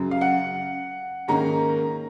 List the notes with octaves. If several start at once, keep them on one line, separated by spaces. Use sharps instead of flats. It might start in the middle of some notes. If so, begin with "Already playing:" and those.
Already playing: F#2 C#3 F#3
F5
F#5
G#2 D#3 A#3 C#4 A#5